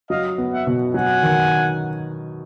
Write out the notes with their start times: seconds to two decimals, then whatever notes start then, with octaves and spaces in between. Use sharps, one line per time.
0.10 F#3 D#5 F5
0.38 B3
0.52 E5 F#5
0.67 B2
0.94 F#3 F#5 G#5
1.23 D#3